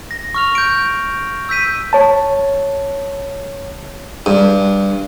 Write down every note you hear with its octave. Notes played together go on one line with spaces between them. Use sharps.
A#6
C#6 F6 F7
G6 D7
E6 G6 B6 D#7
C#5 A5
G2